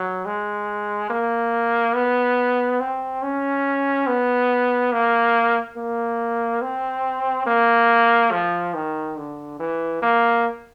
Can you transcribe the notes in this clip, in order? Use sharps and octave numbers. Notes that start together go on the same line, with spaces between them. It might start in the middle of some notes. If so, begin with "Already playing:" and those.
Already playing: F#3
G#3
A#3
B3
C4
C#4
B3
A#3
A#3
C4
A#3
F3
D#3
D3
E3
A#3